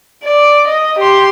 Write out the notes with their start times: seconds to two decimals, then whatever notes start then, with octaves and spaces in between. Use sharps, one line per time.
0.24 D5
0.68 D#5
0.99 G4 C6